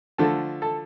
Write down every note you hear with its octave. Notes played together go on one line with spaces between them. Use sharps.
D3 F3 A3 A4 A5
A4 A5